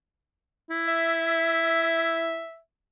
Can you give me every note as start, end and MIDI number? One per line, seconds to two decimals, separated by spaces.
0.70 2.44 64
0.88 2.59 76